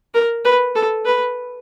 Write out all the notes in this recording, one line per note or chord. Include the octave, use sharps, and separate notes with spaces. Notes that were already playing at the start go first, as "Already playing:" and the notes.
A#4
B4
A4
B4